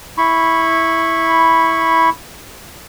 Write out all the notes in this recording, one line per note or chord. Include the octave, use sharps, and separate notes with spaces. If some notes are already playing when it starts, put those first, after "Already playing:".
E4 B5 C#6